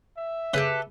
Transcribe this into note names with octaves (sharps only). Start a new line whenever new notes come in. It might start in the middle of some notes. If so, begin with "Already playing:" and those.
E5
C#3 G4 A4 B4